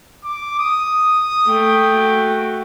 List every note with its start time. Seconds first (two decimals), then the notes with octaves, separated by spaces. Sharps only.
0.24 D6
0.59 D#6
1.47 A3 G5
1.93 F#4